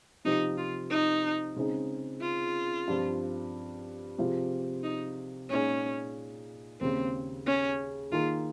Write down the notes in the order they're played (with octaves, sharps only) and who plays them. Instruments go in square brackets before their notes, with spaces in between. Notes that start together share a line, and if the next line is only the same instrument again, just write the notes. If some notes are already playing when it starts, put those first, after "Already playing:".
[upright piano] C3 F3 C4 G4 [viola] D#4
[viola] F4
D#4
[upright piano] C#3 G#3 C4 D#4 G#4
[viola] F4
[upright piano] G2 F3 C4
C3 F3 C4 F4 G#4
[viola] D#4
[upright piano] A#2 G#3 D#4 G#4 [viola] C#4
[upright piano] D#2 C#3 G#3 [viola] C4
[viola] C#4
[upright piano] D#3 A#3 D#4 G#4 [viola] F4